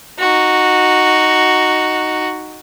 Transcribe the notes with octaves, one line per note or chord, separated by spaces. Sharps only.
D#4 F#4